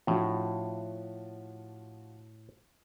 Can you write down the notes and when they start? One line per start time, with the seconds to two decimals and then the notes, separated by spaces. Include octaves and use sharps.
0.07 A2 F3 D4 F#4